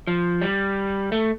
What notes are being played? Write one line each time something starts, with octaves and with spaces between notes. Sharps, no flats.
F3
G3
A3